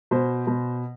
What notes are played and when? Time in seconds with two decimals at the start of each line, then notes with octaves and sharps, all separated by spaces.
0.11 B2 C5
0.47 B2